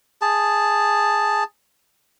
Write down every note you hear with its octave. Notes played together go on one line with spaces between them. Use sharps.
G#4 A5